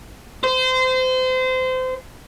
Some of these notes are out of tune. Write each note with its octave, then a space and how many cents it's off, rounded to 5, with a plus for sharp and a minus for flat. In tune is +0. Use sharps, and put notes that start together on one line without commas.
C5 -25